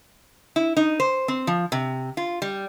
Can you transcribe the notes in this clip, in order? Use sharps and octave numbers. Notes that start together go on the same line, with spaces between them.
E4
D#4
C5
C4
F3
C3
F4
G3